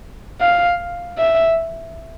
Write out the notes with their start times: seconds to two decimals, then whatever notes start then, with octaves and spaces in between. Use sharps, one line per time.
0.41 F5
1.18 E5